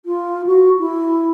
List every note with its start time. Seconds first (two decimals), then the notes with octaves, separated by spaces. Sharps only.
0.05 F4
0.46 F#4
0.79 E4